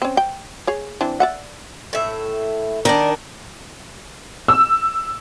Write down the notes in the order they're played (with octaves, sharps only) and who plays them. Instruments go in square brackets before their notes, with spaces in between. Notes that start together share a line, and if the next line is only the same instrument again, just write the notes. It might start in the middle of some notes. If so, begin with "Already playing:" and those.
[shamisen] C4 C#4
G5
G#4 C#5
E3 C4 D4
D5 E5 F#5
[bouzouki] A2 E5
[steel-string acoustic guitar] D#3 D4 [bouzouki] A#4 D5
[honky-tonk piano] E6